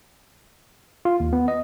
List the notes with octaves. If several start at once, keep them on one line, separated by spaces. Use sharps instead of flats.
F4
D#2
B3
D#5